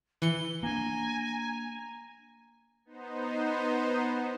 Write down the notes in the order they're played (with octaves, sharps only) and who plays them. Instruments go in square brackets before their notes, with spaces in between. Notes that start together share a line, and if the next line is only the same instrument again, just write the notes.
[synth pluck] E3 C#7 [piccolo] G7
[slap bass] A#3 D4 [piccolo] G#5 [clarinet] A#5
[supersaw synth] B3 D#4 C5